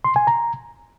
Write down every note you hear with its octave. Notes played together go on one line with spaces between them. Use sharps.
C6
G#5
A#5